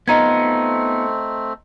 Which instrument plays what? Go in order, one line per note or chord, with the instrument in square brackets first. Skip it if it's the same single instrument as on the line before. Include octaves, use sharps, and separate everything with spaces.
[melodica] A3 C4 [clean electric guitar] B3 D#4 F4 [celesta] D#5 A#5 G#6